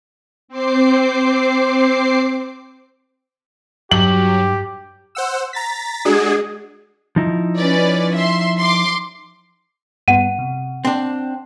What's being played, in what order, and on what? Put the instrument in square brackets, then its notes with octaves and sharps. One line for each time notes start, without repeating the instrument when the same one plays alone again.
[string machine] C4 C5 D6 C7
[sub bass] G2 [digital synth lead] F#3 [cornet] G4 [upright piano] F#7
[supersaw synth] C5 F#5 E6
A#5 A6 B6
[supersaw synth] G#3 D4 F#4 [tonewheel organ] G#4
[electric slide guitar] F3 D#4 E4
[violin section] C#4 B4 D5
E5 C6
C6 D6
[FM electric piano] G2 B3 [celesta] F#5 D#7
[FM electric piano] C3
[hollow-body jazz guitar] C4 D4 [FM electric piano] G5